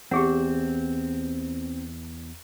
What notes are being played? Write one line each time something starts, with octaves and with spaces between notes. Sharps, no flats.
E2 C4 G4 G#4 F#5